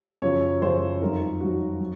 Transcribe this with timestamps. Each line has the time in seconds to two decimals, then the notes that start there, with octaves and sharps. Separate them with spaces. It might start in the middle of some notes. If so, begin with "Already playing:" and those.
0.22 F#2 C#3 F3 C#5
0.62 F#2 C#3 F3 C5
1.01 F2 D#3 F#3 A#4
1.41 F2 D#3 F#3 F#4
1.80 F#3